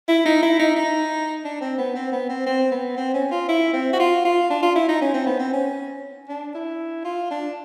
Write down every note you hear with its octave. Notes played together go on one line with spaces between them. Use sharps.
E4
D#4
E4
D#4
D#4
D4
C4
B3
C4
B3
C4
C4
B3
C4
C#4
F4
E4
C4
F#4
F4
F4
D4
F4
E4
D#4
C#4
C4
B3
C4
C#4
D4
E4
F4
D4